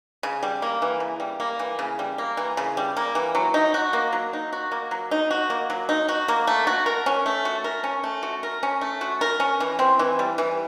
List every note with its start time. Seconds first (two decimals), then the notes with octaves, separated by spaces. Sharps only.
0.23 C#3
0.43 G3
0.62 A#3
0.82 E3
1.00 C#3
1.20 G3
1.40 A#3
1.59 E3
1.79 C#3
1.99 G3
2.18 A#3
2.37 E3
2.57 C#3
2.77 G3
2.97 A#3
3.15 E3
3.35 F#3
3.54 D#4
3.74 F#4
3.93 A#3
4.13 F#3
4.33 D#4
4.52 F#4
4.72 A#3
4.91 F#3
5.11 D#4
5.31 F#4
5.50 A#3
5.70 F#3
5.89 D#4
6.08 F#4
6.28 A#3
6.47 A3
6.67 F#4
6.86 A#4
7.06 C#4
7.26 A3
7.45 F#4
7.64 A#4
7.84 C#4
8.04 A3
8.23 F#4
8.43 A#4
8.63 C#4
8.81 A3
9.01 F#4
9.21 A#4
9.40 C#4
9.60 E3
9.79 C4
9.99 E3
10.19 G3
10.38 E3